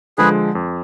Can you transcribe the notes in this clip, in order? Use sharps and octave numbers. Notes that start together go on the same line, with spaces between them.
D3 F3 G#3 G#4 B4
F2